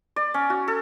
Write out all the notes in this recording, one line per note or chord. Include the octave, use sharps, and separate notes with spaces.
D5
C#4
F#4
A4